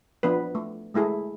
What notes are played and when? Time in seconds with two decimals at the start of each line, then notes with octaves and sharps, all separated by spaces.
0.23 F3 B3 D4 B4
0.55 A3
0.94 G#3 A3 E4 G#4 A4